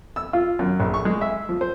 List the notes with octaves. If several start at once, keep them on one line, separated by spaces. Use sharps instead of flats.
E6
F4
F#2
A#1
C#6
G#3
E5
F3
C5